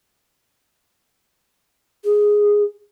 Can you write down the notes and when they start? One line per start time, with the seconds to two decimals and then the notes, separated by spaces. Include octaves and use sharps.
2.04 G#4